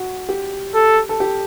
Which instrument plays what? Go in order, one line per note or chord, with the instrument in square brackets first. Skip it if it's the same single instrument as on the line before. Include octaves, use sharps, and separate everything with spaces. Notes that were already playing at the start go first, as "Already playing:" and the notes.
Already playing: [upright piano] F#4
G4
[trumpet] A4
[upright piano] A4
G4